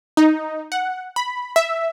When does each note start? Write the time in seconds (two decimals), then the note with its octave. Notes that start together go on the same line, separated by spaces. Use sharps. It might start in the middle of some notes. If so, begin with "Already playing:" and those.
0.17 D#4
0.72 F#5
1.16 B5
1.56 E5